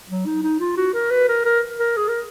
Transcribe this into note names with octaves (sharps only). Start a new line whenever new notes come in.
F#3
D#4
D#4
F4
F#4
A#4
B4
A#4
A#4
A#4
G#4
A#4